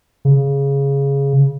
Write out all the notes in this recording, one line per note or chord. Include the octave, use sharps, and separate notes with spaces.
C#3